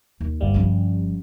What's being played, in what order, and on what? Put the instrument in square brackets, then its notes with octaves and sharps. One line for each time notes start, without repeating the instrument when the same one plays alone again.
[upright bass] D#2
[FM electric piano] G1 G3
[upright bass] F3 C#4